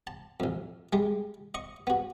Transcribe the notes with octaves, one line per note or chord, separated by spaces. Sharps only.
A5
A1 F2
G3 G#3
D#5 C#6
B3 F#4